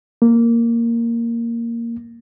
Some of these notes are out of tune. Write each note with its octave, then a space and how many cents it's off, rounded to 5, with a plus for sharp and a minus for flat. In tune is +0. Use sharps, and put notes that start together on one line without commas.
A#3 -5